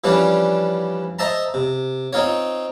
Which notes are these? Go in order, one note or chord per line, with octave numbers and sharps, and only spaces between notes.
E3 F3 G3 C#4 D4
C5 D#5 E5 A5 A#5
C3
C4 D#4 F4 C#5